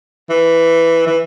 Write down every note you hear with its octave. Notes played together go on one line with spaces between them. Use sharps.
E3
E3